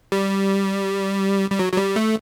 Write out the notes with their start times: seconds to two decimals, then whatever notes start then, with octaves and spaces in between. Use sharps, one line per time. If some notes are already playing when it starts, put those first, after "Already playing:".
0.12 G3
1.50 G3
1.59 F#3
1.73 F#3
1.77 G3
1.96 A3